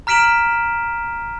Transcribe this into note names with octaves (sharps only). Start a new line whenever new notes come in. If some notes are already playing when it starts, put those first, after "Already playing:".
A#5 F6 B6 D7 E7 F#7